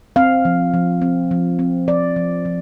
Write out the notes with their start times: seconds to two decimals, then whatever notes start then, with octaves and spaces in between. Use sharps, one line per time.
0.16 C4 F5
0.45 F3
0.74 F3
1.02 C4
1.31 F3
1.59 C4
1.88 F3 D5
2.16 F3
2.45 F3